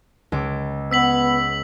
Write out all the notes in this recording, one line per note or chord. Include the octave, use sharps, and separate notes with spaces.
C#2 D6
B3 E6 B6 F#7